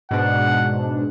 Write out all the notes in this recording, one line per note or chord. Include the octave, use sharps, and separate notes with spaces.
G#2 B2 D4 F#5